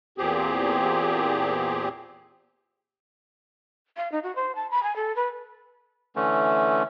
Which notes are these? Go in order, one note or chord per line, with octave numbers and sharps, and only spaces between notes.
E2 A#2 C4 G4 G#4
F5
D#4
F#4
C5
A5
B5
G#5
A4
B4
D3 E3 A3 C#4